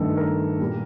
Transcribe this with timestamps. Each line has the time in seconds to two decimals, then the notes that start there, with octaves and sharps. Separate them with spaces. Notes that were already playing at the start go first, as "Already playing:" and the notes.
Already playing: G2 D#3 A3 D4 A4
0.17 A#4
0.59 A#2 G3 A#3